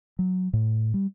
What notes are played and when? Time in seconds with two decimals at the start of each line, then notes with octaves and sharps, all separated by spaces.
0.19 F#3
0.53 A2
0.94 G3